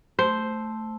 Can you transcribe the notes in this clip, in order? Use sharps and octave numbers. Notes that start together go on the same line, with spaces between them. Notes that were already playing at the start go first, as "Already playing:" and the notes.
A3 C5 A5 E6